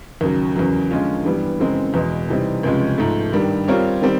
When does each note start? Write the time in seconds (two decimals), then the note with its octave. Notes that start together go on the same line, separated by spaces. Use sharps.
0.21 D#2 C#3 F#3
0.56 E2 C#3 F#3
0.91 D3 F3 G#3 C#4 F4
1.25 G2 E3 G3 B3
1.60 F#2 C#3 E3 G#3 C4
1.94 E2 B2 G#3
2.29 C3 E3 G3 C4 D#4
2.63 C#2 C3 F3 G#3 C#4
2.98 G#2 F3 A3
3.33 G2 D#3 G3
3.68 G3 C4 F4 A#4 C#5
4.02 D#3 G3 C4